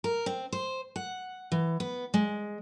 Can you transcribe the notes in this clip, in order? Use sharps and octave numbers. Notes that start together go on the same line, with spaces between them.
A#4
C4
C5
F#5
E3
B3
G#3